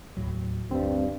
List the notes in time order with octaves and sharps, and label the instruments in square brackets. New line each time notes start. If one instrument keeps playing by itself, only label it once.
[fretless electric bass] D#2 A2 F#3
[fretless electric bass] D2 G3 [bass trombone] G2 [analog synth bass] C4